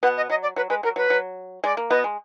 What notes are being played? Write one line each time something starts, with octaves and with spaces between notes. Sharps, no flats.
B2 B3 F#5
D#5
F#3 D#5
D5
F#3 B4
G#3 B4
F#3 A#4
F#3 B4
F#3
G#3 D5
A#3
B2 B3 D#5
G#3